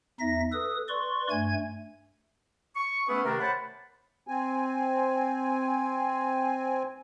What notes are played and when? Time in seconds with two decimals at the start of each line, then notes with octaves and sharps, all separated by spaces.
0.20 E2 D#4 E5 A#6
0.53 A4 B4 D#6
0.88 B4 D5 C6 C#6
1.31 G2 A3 G#5 G#6
2.76 C#6
3.09 A3 B3 C#4 E4 G#4 B4
3.25 C3 D#3 A3 D4 A#4
3.40 C5 C#5 F#5 A5 B5
4.27 C4 G#5